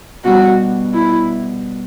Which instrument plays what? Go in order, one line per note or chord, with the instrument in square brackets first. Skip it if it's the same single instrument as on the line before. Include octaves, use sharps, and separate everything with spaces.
[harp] B2 G3 D4 [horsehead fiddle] F#4
[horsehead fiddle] E4